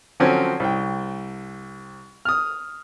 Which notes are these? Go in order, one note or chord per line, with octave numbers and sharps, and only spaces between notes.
D3 F3 F#3 C4 C#4
C2 G5
D#6 F6